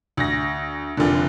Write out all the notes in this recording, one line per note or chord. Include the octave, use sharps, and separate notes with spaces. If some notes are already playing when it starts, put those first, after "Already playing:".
D2 A#6
F1 A#2 D3